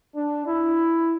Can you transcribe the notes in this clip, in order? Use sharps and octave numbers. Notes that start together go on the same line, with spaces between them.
D4
E4